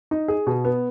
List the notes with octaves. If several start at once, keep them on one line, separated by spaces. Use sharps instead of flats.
D#4
G#4
B2
B3